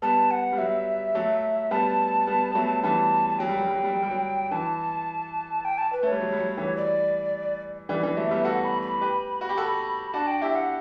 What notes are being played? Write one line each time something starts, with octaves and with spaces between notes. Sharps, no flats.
G3 B3 A5
F#5
G3
F#3 E5
F#3 A3
G3 B3 A5
G3 B3
B3
F#3 A3
E3 G3 A5
A5
F#3 G5
G3
F#3
G3
F#3
G3
F#3
G3
F#3
E3 A5
G5
A5
B4
A3
G3 C#5
F#3
G3
F#3
E3 G3
D5
E3 G3 D5
E3 G3
F#3 A3 E5
G3 B3
F#4 A4 F#5
B5
B5
G4 B4
F#4
G4
F#4 A4
D4 F#4 A5
G5
E4 G4 E5
F#5